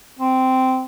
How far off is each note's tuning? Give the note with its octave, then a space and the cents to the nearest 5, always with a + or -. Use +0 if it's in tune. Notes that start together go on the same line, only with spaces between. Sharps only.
C4 -10